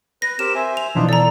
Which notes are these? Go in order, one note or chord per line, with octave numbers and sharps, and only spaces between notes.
B4 A#6
C4 G4 A#4 E7
C5 E5 G#5
F7
B2 E3 F3 D4 D#4 F4
A4 D5 A#5